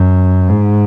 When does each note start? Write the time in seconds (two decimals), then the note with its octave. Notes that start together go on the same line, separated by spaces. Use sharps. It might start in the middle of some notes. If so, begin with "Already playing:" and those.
Already playing: F#2
0.49 G#2